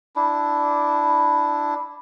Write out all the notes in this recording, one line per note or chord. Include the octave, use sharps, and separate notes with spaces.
D4 E4